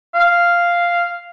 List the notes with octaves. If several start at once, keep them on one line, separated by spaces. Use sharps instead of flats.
F5